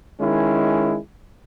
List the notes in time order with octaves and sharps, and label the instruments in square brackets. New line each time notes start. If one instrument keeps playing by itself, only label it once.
[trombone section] D#3 G#3 C#4 E4